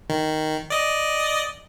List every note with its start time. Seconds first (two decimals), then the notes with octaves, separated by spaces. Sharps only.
0.10 D#3
0.70 D5 D#5